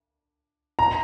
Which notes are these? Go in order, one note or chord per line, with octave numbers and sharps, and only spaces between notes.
A#5